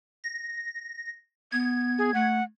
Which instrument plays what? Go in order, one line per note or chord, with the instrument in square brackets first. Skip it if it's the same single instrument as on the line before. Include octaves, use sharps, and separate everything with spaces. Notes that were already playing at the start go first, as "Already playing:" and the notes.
[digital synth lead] A#6
[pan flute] B3 [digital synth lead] G#6
[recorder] G#4
[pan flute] A3 [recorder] F#5